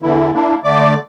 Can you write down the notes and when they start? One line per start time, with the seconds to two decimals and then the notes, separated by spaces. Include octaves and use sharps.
0.02 E2 D3 E3 E4
0.34 A#3 D4 E4
0.64 D3 A3 D5 D6